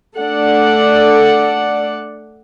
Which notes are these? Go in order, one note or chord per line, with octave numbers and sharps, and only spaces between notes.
A3 D4 A4 D5 F#5